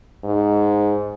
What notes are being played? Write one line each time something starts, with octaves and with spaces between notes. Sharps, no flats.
G#2